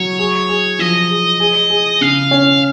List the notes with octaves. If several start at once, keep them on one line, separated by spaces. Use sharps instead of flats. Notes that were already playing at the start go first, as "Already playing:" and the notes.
Already playing: F#3 C#5
G#4
G#4
F3 D#5
G#4
G#4
G#4
C#3 F5
C#4